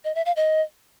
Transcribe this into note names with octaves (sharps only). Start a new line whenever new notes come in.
D#5
E5
F5
D#5